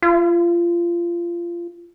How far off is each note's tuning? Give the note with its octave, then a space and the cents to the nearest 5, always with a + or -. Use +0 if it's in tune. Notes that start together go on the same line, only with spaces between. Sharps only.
F4 -25